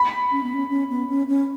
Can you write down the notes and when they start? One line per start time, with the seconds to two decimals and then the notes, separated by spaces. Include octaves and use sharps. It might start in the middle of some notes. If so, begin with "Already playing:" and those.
Already playing: B5
0.31 C#4
0.43 B3
0.54 C#4
0.70 C#4
0.90 B3
1.09 C#4
1.28 C#4